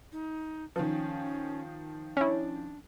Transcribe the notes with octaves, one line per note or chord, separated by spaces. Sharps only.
D#4
D#3 F3 C#4
C#4 D4 E4